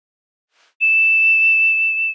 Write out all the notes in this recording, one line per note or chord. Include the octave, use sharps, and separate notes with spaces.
E7